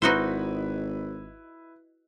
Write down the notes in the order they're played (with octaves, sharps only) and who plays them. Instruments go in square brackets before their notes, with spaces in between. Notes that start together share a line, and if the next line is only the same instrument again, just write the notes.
[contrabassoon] G#1 [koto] D#4 F#4 C5 [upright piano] E4 B4